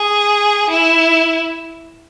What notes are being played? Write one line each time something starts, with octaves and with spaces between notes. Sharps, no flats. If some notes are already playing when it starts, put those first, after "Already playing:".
Already playing: G#4
E4